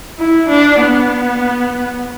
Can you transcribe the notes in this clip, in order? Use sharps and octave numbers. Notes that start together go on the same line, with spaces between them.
E4
D4
B3